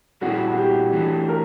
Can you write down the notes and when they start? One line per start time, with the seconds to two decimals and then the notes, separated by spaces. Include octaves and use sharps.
0.21 A#2 G3 C4 E4 F#4 G#4
0.52 F#4
0.58 G4
0.93 E3 A3 D4
1.28 A#4